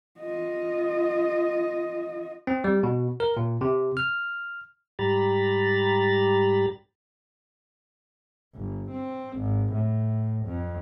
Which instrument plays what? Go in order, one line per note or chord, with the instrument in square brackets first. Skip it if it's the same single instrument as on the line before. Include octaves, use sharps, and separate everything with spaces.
[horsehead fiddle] F4 D#5
[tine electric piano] C4
G3
B2
A#4
A#2
C3
F6
[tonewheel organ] G#2 G3 G4 A#5 B5 A6
[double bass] G1
C4
G#1
A2
F2